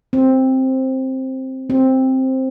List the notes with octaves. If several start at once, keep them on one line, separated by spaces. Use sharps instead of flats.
C4
C4